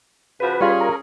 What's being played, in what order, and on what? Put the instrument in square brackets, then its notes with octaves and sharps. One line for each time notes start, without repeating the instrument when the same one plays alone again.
[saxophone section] C#3 F3 F#4 [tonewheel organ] B4
[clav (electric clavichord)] G3 F4 [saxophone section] C#4 G#4
[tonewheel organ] A#4